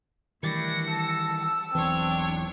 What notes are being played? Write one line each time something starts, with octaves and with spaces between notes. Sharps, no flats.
D#3 E3 G3 A3 D4 E4 A#6 C#7
A5 E6
E1 B1 E3 C4 D4 C#5